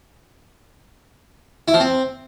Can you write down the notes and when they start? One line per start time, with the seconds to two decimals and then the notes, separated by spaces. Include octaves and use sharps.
1.68 E4
1.74 F3
1.80 C4